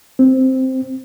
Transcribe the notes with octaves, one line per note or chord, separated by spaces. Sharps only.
C4